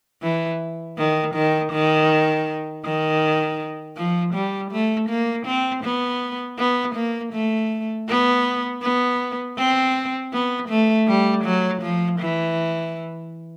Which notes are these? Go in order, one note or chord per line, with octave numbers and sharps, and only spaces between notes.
E3
D#3
D#3
D#3
D#3
F3
G3
A3
A#3
C4
B3
B3
A#3
A3
B3
B3
C4
B3
A3
G3
F#3
F3
E3